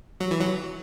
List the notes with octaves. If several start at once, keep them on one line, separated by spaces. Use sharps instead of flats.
F#3
E3
F#3